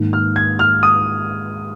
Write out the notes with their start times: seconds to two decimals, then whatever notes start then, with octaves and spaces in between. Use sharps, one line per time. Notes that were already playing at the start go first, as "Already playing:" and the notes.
Already playing: G#2 D#3 A#3
0.13 F6
0.36 G#6
0.59 F6
0.83 D#6